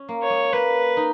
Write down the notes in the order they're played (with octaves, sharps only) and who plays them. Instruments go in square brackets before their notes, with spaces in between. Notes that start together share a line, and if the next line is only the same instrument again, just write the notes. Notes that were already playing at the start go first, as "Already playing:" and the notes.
Already playing: [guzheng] C#4
A#3
[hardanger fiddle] C#5
[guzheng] G#3
[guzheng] A#3 [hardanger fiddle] B4
[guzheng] D#4